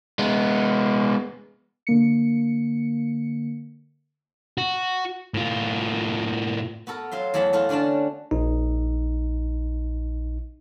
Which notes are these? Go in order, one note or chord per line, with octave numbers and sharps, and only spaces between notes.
G#3 B3
D3 A#3 C#7
F#4
A2 F4
B3 F#4 A4 A#4
F#3 F4 E5 C6
E2 F#3 A3 A5 B5
E3 A3 F4 F#4
D3 C#4 D4 F#4 A5
A#1 D#4